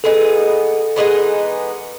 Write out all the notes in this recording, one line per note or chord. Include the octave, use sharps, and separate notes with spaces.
E3 G#3 B3 D#4 A4
E3 G#3 B3 D#4